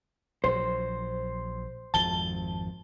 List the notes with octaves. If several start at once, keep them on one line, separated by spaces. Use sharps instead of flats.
A#1 F#3 C5
G#1 F2 F3 A5 G7